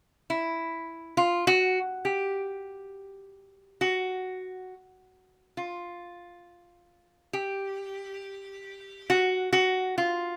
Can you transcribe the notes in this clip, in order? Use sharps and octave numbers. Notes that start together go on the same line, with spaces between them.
E4
F4
F#4
G4
F#4
F4
G4
F#4
F#4
F4